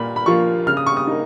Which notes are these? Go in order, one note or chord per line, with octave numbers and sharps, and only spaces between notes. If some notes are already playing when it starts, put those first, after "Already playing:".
Already playing: A#2 A#3 B5
B5
F3 A#3 F4 C#6
C#3 F6
D#6
C#6
D#6
A#3 D#4